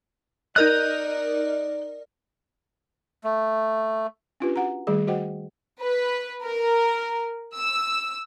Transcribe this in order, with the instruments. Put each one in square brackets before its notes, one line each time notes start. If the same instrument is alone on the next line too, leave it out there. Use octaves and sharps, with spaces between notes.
[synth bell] D#4 A#4 D#5 [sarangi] D5 [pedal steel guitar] F#6 G6
[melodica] A3
[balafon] C#4 D4 F4 G4 B4
F#4 F#5 A#5
D#3 G3 A3 G#4
F#4 C5 D#5 F#5 G5
[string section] B4
A#4
E6